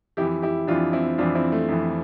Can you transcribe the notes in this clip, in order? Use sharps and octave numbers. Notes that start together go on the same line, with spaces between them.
F2 E3 E4 G4
E4 G4
F2 E3 D4 F4
C4 E4
F2 E3 D4 F4
C4 E4
A3
F2 E3